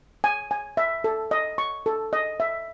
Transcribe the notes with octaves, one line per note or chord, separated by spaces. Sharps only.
G#5
G#5
E5
A4
D#5
C#6
A4
D#5
E5